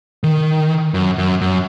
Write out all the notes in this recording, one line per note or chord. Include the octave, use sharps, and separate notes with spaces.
D#3
F#2
F#2
F#2